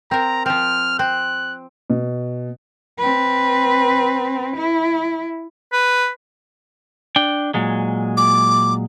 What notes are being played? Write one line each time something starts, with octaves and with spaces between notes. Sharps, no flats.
C4 A#4 A#5
F3 C4 F6
C4 F#6
B2
C4 B4
E4
B4
D4 G5
A#2 F#3 G#3
D6